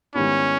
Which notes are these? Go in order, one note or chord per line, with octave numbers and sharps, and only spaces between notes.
G#2 D#3 G3 B3 C#4 E4